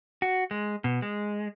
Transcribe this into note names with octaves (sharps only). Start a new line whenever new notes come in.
F#4
G#3
B2
G#3